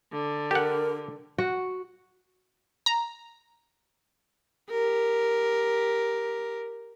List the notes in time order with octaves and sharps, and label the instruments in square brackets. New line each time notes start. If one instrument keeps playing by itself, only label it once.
[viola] D3
[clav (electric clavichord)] G4 F#5 [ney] A#4
[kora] F#4
[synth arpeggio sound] A#5
[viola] G4 A#4